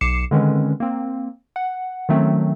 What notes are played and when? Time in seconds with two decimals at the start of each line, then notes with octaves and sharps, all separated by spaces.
0.01 B1 D6 C7 C#7 E7
0.31 D3 D#3 G#3 C4 C#4 B4
0.80 A#3 C4
1.56 F#5
2.09 D#3 F#3 A3 C4 C#4